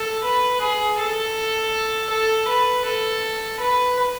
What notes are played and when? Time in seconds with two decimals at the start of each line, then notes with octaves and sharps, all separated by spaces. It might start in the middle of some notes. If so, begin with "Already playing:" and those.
Already playing: A4
0.24 B4
0.61 G#4
0.98 A4
2.10 A4
2.48 B4
2.85 A4
3.60 B4